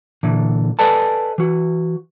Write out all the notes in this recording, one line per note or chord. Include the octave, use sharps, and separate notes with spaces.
A#2 D3 E3
A4 B4 D5 D#5 G#5 A5
E3 F#4